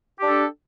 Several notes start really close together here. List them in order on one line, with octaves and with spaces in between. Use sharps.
G4 D4 A4